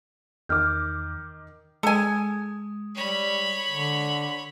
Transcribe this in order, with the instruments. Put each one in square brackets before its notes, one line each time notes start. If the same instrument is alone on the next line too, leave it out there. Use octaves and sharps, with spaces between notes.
[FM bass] E2 [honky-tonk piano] D#3 D6 [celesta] F6 G6
[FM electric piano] G#3 [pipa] A4 G#5
[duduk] G3 [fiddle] C#5 B5
[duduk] D3